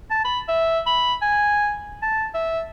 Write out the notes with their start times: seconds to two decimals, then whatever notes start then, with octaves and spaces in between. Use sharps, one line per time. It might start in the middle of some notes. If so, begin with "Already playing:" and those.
0.11 A5
0.24 B5
0.48 E5
0.87 B5
1.22 G#5
2.02 A5
2.34 E5